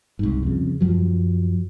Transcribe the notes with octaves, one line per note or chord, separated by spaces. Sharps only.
C2 G#2
F2 C#3
F#2 F3 F#3